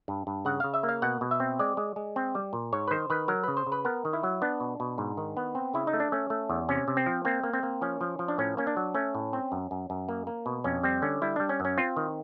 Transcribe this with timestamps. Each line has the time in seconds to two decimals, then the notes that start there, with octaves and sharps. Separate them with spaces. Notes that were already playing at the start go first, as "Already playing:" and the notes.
0.08 G2
0.27 G2
0.45 C#3 F#5
0.60 C#3 F5
0.74 E5
0.83 A#3
0.89 F5
1.02 B2 F#5
1.21 B2
1.31 E5
1.40 C4
1.59 G#3 D5
1.77 G#3
1.96 G#3
2.16 C4
2.35 G3
2.53 A#2
2.73 G#2 C#5
2.88 B4
2.91 D#3 C5
3.10 D#3 B4
3.28 F#3 A#4
3.44 C#3 B4
3.57 C5
3.67 C#3
3.72 B4
3.85 B3 A#4
4.05 D#3
4.13 E4
4.23 F#3
4.42 B3 D4
4.60 B2
4.80 B2
4.98 G#2
5.17 D#3
5.37 B3
5.55 C4
5.74 C#3 E4
5.87 D#4
5.93 A3
6.00 D4
6.12 A3 C#4
6.30 A3
6.49 E2
6.69 C3 C#4
6.88 C3
6.97 C4
7.06 F3
7.25 A#3 C4
7.43 A#3
7.53 C4
7.63 A#3
7.81 F3 C#4
8.01 F3
8.19 F3
8.28 D4
8.38 A2 C#4
8.57 A#3 C#4
8.67 D4
8.77 F#3
8.94 A3 C#4
9.15 A2
9.33 C4
9.52 F#2
9.71 F#2
9.90 F#2
10.09 A#3
10.27 A#3
10.46 B2
10.64 F2 C#4
10.83 G3 C4
11.02 D3 C#4
11.22 G3 E4
11.36 G3 D4
11.49 C#4
11.60 F#2 C#4
11.78 C4 F4
11.97 D#3